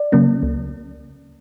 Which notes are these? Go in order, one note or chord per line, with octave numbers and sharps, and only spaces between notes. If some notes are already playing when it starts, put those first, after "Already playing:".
Already playing: D5
C#3 F#3 A#3 C#4
C#2